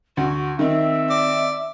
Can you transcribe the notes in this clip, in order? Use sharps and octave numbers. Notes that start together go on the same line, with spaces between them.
D2 F#4
D#3 C4 E5
D5